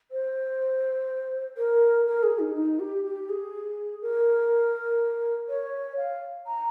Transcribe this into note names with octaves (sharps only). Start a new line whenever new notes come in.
C5
A#4
A#4
G#4
D#4
D#4
G4
G4
G#4
A#4
C#5
F5
A#5